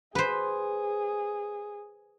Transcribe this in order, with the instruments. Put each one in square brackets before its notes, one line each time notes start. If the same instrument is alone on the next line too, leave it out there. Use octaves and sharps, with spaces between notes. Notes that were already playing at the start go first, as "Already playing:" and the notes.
[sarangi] G#4 [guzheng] B4 C5